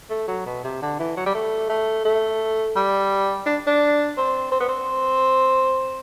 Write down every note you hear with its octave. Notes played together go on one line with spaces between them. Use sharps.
A3
F#3
B2
C3
D3
E3
F#3
G3
A3
A3
A3
G3
D4
D4
C4
C4
B3
C4